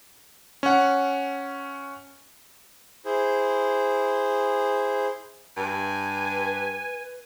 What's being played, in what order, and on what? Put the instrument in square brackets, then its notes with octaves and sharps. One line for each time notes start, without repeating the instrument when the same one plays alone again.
[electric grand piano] C#4 F#5
[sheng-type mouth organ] E4 G#4 C5
[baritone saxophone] G2 [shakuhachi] B4 [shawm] G#5